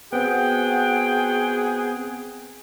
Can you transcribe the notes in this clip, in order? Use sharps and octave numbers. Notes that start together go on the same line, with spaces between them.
B3 C4 F#4 G#4 F#5 G5